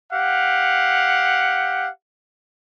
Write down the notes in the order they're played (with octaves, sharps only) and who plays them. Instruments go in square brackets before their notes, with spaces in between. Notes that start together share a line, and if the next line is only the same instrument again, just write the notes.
[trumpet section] G4 F5 F#5